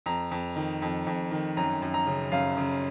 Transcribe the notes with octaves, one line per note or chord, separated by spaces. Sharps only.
F2 A#5
F2
D#3
F2
F2
D#3
F#2 A#5
F#2
A#5
C#3
F#2 F5
C#3